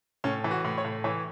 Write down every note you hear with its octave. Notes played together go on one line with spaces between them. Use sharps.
A2 C#4
E3
F#4
A2
C#5
A2
E3 C#5